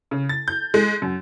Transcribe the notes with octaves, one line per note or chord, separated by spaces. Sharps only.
C#3
A6
G6
G#3
F#2